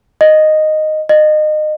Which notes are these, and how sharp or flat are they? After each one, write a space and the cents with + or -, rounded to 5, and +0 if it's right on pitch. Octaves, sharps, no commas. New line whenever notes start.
D#5 -5
D#5 -25